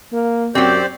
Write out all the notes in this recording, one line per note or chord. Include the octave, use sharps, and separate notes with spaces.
A#3
F#2 F#3 C4 G4 C5 D5